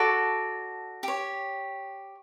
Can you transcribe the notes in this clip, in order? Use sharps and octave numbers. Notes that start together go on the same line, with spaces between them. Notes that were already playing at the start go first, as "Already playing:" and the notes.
Already playing: F#4 A4 D5 C#6
G4 C#5